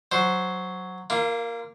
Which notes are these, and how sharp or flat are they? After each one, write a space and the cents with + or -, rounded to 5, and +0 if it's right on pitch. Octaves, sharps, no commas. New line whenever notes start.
F#3 +0 C5 +0
A#3 +0 F4 -35